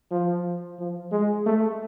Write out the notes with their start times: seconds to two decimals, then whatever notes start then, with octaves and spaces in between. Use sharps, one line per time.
0.11 F3
0.79 F3
1.12 G#3
1.46 A3